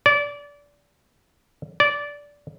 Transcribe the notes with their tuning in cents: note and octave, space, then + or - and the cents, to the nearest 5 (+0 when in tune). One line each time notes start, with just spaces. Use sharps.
D5 -25
D5 -15